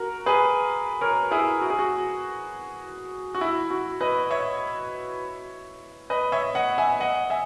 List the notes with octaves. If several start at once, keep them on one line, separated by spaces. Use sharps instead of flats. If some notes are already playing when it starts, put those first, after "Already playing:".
Already playing: F#4 A#4
G#4 B4
A#4 C#5
E4 G#4
F#4
G#4
F#4
F#4
E4
F#4
B4 D#5
C#5 E5
B4 D#5
C#5 E5
D#5 F#5
E5 G#5
D#5 F#5
E5 G#5